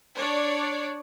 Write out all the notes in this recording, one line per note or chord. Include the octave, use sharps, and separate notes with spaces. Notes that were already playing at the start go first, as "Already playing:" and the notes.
D4 C#5 D5